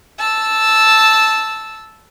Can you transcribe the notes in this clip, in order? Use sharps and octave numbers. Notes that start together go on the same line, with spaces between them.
A5 E6